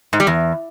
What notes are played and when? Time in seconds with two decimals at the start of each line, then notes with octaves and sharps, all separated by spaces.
0.13 G#2
0.20 G3
0.27 E2